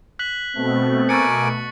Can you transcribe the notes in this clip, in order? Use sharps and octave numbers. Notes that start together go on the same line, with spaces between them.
F#6 B6 F#7
B2 A3 C4
A#4 G#5 C#6 D6 A6 C#7